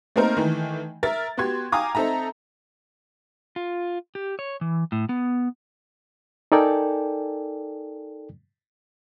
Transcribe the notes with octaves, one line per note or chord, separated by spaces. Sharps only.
A3 A#3 C4 D#4 A#4 C5
D#3 E3 A3
A#4 E5 A6
B3 F#4 G4 C6 G#6
F5 G5 G#5 A#5 D6 D#6
C4 D#4 A4 E5 A#5
F4
G4
C#5
E3
A2
B3
D#4 A4 A#4 D5 G5 G#5